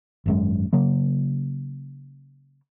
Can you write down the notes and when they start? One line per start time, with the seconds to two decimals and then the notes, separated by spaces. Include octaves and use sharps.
0.26 G#1 F#2 G#3
0.73 C#3 F#3 A#3